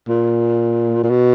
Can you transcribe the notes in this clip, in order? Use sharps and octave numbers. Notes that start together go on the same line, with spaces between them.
A#2
A#2
B2